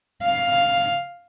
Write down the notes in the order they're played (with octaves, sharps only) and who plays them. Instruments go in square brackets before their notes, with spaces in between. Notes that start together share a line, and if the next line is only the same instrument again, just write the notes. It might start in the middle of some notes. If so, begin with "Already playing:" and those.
[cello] F5